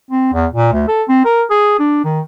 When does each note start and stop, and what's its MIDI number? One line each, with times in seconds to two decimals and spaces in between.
0.11 0.30 60
0.33 0.46 40
0.53 0.72 46
0.73 0.85 38
0.88 1.03 69
1.08 1.23 60
1.25 1.42 70
1.50 1.74 68
1.79 2.03 62
2.04 2.20 51